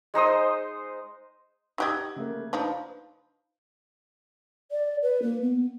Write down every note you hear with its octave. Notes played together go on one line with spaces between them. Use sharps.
G#3 D#4 C5 D#6
D#4 G4 D#5 F#5 F#6 G#6
C#3 A3 A#3
F3 D4 D#4 B4 D5 F5
D5
B4
A#3
B3